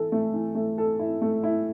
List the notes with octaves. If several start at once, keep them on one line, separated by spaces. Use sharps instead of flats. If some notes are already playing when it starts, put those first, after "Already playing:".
Already playing: E3 A4
A3
E3
A3
A4
E4
A3
E4